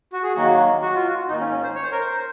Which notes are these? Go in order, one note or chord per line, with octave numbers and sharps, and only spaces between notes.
F#4
G#4
D#3 F#3 A#3 F#4
F#4
F4
F#4
G#2 D#3 A#3 D#4
C#4
C#4
C5
C#5
C5
A#4
C5